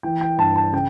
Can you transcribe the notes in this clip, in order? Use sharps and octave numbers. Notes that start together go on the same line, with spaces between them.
E3 G5
G5
G2 A5
A5
C#3 G5